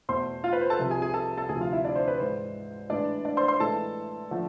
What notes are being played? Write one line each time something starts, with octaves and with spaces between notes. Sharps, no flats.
E2 B2 A3 C5 C6
F4 F5
B4
C5
A4 A5
C2 C3 F3
G#4 G#5
G#4 G#5
A4 A5
A4 A5
D2 C3 F3 G#4 G#5
F4 F5
E4 E5
D4 D5
C5
B4
G#2 E3 G#3 C5
A2 E3 G#3 D4 D5
D4 D5
C5 C6
C5 C6
A2 E3 G#3 A4 A5
D3 F3 A3